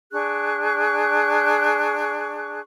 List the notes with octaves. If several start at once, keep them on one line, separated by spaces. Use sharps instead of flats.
D4 G#4 C#6 F#6